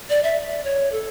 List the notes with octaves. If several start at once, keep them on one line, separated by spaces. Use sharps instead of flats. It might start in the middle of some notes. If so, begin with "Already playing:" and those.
D5
E5
D5
C#5
A4